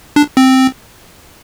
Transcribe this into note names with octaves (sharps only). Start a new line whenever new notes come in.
D4
C4